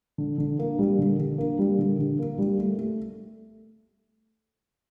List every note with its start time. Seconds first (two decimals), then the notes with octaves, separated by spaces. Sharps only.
0.18 D3
0.38 D3
0.59 A#3
0.79 G3
0.98 D3
1.19 D3
1.38 A#3
1.59 G3
1.79 D3
1.99 D3
2.19 A#3
2.38 G3
2.58 A3
2.78 A3